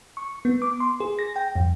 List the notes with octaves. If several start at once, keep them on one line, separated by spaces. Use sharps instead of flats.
C#6
B3
D6
C6
G#4
A#6
G5
F2